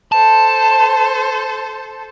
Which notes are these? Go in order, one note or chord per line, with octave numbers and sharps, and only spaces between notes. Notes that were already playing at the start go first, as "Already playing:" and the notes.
A4 C5 A5